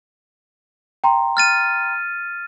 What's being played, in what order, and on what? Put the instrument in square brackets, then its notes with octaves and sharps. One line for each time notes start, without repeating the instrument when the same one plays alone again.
[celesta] G5 A#5 C6
[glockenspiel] F6 A6 D#7